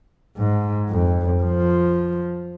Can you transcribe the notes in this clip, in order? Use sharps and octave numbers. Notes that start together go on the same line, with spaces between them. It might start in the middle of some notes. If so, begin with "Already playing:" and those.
G#2
F2
F3